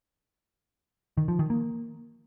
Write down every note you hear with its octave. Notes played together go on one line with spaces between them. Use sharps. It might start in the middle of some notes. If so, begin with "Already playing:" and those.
D#3
F3
D#3
A#3